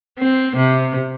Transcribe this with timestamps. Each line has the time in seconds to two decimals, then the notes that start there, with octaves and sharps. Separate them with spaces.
0.18 C4
0.57 C3